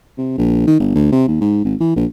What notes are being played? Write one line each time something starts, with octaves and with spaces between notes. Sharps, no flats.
C3
A#1
D#3
G1
D2
C3
D#2
G#2
G#1
E3
A#1